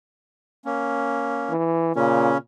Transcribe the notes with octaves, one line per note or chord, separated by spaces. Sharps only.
A#3 C#4
E3
A#2 C#3 C#4